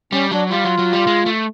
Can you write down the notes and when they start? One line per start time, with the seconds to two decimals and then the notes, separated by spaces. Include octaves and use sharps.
0.12 G3 C#4
0.31 F#3 D4
0.50 G3 F4
0.65 F#3
0.78 F#3
0.93 G3
1.07 G#3
1.26 A3